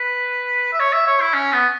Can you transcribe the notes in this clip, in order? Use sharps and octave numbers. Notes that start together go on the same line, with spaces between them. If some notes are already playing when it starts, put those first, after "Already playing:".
Already playing: B4
E5
C#5
E5
C#5
E4
C#4
B3